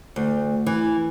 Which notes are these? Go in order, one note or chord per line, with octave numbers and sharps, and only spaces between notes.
D2
E3